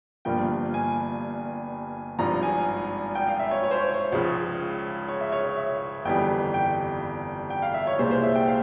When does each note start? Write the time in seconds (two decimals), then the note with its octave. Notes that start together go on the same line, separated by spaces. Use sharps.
0.25 G1 G2 F3 A#3 G5
0.74 G#5
2.19 G#1 G2 F3 A#5
2.43 G#5
3.15 G5
3.28 F5
3.39 E5
3.51 C#5
3.64 C#5
3.71 C5
3.77 C#5
4.12 C#2 C#3 F3
5.08 C#5
5.21 E5
5.32 C#5
5.45 C#5
5.57 E5
6.05 G1 F2 E3 G3 G5
6.54 G5
7.50 G5
7.62 F5
7.74 E5
7.87 C#5
7.99 C2 A#2 G#3 C5
8.11 C5
8.23 E5
8.35 G5
8.47 F5